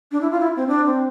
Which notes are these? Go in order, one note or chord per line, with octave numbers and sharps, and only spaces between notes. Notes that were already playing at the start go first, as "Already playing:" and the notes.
D4
E4
F4
E4
C4
D4
C4